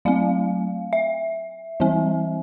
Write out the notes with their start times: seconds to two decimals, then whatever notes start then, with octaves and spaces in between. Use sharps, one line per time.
0.05 F#3 A3 C4 F5
0.93 E5
1.80 E3 G3 C4